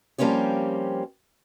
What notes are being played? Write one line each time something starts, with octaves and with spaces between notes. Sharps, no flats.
F3 G3 A#3 C4 C#4 G4